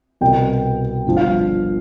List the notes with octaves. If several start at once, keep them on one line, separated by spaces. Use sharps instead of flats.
C2 B2 G3 G5
G1 G2 F3
F5